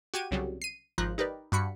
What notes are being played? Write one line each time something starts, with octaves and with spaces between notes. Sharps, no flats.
F#4 G4 G#6 D#7
C2 C#3 F#3 G3
C7 D#7
G#1 F3 A#5 F#6
D#4 G4 A#4 B4 D5
G2 F#4 B5 C#7